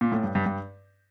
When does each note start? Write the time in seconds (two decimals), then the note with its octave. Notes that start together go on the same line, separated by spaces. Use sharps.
0.01 A#2
0.12 A2
0.24 G2
0.35 G2
0.46 G2